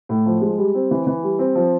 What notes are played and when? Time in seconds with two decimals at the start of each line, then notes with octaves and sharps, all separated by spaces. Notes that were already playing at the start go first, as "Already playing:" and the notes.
0.09 A2
0.26 F3
0.42 G#3
0.58 G3
0.75 C4
0.91 E3
1.07 E3
1.23 G3
1.39 C4
1.55 F3